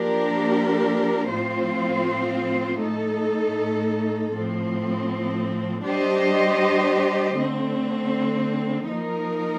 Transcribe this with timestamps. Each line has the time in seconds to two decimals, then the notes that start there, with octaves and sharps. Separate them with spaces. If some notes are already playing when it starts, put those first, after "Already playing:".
Already playing: F3 A#3 D4 G4 A#4
1.30 A2 F3 C4 F4 C5
2.80 A2 A3 D#4 A4
4.32 A2 F3 C4
5.83 G3 D4 G4 C5 D#5
7.35 D3 A3 C4
8.86 F3 A#3 D#4 A#4